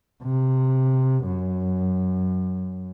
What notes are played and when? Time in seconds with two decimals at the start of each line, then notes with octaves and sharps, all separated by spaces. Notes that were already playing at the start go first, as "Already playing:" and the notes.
0.23 C3
1.25 F#2